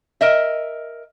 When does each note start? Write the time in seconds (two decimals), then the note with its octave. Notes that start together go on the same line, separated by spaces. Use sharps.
0.21 A#4 D#5 E5